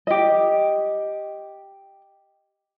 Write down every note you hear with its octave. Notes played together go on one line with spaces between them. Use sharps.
G4 D#5